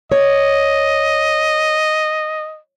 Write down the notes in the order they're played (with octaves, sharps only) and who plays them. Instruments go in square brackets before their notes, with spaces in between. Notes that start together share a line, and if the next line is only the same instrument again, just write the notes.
[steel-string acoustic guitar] C#5 [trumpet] D#5